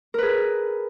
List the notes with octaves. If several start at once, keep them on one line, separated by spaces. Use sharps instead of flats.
G#4 A#4 B4